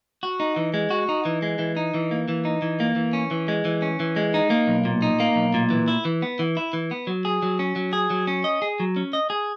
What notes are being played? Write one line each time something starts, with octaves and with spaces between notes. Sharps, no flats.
F#4
D#4
E3
G#3
F#4
D#4
E3
G#3
E3
D#4
E3
A#3
E3
D#4
E3
A#3
E3
C#4
E3
G#3
E3
C#4
E3
G#3
D#4
A#3
B1
A#2
D#4
A#3
B1
A#2
E3
E4
E3
B3
E3
E4
E3
B3
F#3
G#4
F#3
C#4
F#3
G#4
F#3
C#4
D#5
G#4
F#3
C#4
D#5
G#4